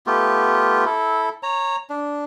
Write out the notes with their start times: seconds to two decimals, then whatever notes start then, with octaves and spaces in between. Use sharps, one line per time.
0.07 A3 B3 F4 G4
0.86 E4 A4
1.43 C#5 A#5
1.90 D4